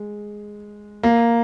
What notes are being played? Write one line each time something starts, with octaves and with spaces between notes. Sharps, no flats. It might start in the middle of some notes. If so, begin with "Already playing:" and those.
Already playing: G#3
A#3